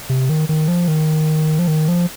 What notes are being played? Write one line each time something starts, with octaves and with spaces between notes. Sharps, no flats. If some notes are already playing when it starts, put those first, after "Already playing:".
C3
D#3
D#3
F3
D#3
F3
D#3
F3